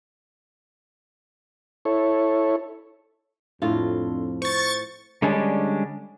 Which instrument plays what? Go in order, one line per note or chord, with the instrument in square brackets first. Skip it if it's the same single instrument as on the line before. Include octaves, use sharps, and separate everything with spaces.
[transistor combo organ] E4 A4 C#5
[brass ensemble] F2 [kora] A2 F4 [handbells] D4 A4 C6
[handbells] C5 [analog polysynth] C#6 A6
[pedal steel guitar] D3 G3 G#3 C#4 D4